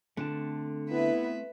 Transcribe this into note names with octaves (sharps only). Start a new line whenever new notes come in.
D3 A3 C4 A5
B3 E4 B4 E5